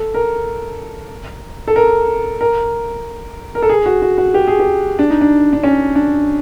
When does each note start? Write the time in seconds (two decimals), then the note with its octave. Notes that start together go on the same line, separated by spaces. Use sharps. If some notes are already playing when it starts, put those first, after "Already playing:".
Already playing: A4
0.14 A#4
1.68 A4
1.76 A#4
2.41 A#4
3.55 A#4
3.62 A4
3.69 G#4
3.86 F#4
4.02 F#4
4.18 F#4
4.34 G4
4.47 G#4
4.60 G4
4.99 D4
5.10 D#4
5.21 D4
5.53 D4
5.64 C#4
5.95 D4